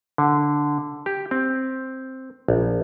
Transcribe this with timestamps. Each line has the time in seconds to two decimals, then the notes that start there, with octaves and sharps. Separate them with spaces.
0.18 D3
1.06 G4
1.31 C4
2.48 A#1